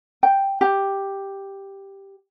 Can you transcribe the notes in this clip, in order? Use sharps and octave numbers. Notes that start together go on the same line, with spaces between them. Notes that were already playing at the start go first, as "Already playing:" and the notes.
G5
G4